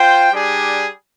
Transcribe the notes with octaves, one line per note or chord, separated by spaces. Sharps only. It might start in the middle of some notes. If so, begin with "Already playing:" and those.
Already playing: F4 C5 G5
G3 D4 G#4